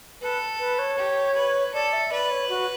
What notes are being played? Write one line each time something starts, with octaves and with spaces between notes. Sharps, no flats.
A4 B4
B4
C#5
G4
B4
A4 D5
E5
B4 D5
C#5
F#4